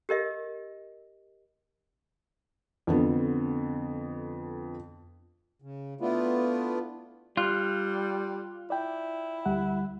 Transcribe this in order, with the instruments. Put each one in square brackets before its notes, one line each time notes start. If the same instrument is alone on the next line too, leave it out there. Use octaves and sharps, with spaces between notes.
[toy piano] G4 A#4 D#5 E5
[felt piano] F2 D3 B3
[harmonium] C#3
A3 B3 D4 E4 F4
[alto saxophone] G3 [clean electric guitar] F4 [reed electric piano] F#6
[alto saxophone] E4 [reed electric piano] D5 G5
[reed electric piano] D2 G3 F#5